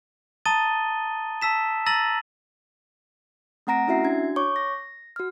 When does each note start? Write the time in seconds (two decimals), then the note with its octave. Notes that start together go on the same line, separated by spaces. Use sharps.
0.45 A5 A#5 D#6 A6 D#7 G7
1.42 A5 E6 B6 E7
1.86 A#5 E6 A6 A#6 D#7 F#7
3.67 A3 C4 F#5 A#5 A#6 D7
3.88 C#4 E4 F#4 E5 C7
4.04 D4 F#4 G#6
4.36 C#5 C#6 D6
4.56 A#6
5.16 F#4 F6